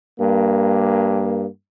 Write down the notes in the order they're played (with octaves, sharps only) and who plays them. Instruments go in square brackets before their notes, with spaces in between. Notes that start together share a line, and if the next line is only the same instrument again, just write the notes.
[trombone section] G2 A#3